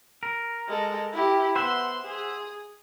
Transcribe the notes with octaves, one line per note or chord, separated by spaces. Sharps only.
A#4
G#3 A4
E4 G4
B3 C5 E5 F#5 C6
G#4